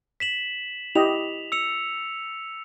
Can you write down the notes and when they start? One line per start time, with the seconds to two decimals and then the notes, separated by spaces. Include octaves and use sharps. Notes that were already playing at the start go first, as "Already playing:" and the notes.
0.20 B6 E7 F#7
0.95 E4 G4 D#5 F7
1.52 E6 C#7 F7